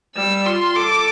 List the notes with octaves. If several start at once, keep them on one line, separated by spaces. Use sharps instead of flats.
G3 E6
F4 C6
A4 D6